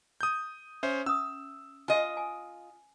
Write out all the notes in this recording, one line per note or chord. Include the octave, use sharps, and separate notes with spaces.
D#6 G6
C#4 C5 E5
C#4 D#6 E6
F4 D#5 G#5
G#5